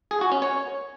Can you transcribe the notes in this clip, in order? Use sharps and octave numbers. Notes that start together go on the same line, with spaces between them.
G#4
F#4
C#4
C#5